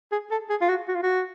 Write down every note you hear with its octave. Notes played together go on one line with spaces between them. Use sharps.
G#4
A4
G#4
F4
F#4
F#4
F4
F#4